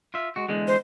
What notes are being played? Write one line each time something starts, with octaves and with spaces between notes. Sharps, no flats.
F4 E5
G#3 F#4
E2 D3 G#3
C5